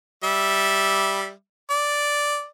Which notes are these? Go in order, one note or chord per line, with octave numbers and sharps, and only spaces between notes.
G3 E5
D5